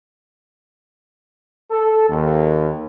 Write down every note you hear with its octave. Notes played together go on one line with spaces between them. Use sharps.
A4
D#2